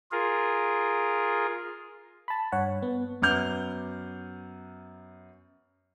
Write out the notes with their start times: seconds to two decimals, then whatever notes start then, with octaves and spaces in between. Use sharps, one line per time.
0.12 F4 G#4 A#4
2.28 A5 B5
2.52 G2 C#5 F#5
2.82 B3
3.22 F#2 B3 F#5 D6 F6 G6